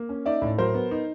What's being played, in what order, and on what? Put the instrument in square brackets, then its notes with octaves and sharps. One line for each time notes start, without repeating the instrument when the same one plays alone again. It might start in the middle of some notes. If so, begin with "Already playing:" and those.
Already playing: [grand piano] A#3
C#4
D#4 D5 E5
A2
F#3 A#4 C5
B3
D#4